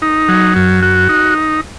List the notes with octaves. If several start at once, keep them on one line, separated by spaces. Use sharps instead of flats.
D#4
F#3
F#2
F#4
D#4